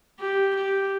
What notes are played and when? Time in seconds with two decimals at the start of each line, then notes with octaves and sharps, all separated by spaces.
0.20 G4
0.56 G4